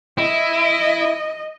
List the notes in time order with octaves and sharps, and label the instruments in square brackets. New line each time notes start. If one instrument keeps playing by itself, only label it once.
[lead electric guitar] E4 [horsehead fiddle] D#5